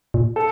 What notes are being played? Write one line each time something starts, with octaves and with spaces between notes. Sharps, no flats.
A#2
A4